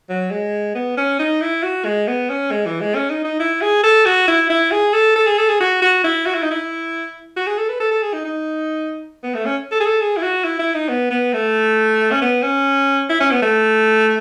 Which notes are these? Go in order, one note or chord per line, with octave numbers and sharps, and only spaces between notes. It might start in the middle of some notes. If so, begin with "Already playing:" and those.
F#3
G#3
B3
C#4
D#4
E4
F#4
G#3
B3
C#4
G#3
E3
G#3
C#4
D#4
D#4
E4
G#4
A4
F#4
E4
E4
G#4
A4
A4
G#4
A4
G#4
F#4
F#4
E4
F#4
E4
D#4
E4
F#4
G#4
A4
B4
A4
A4
G#4
D#4
D#4
B3
A3
C#4
A4
G#4
A4
G#4
E4
F#4
E4
E4
D#4
B3
B3
A3
C#4
B3
C#4
E4
C#4
B3
A3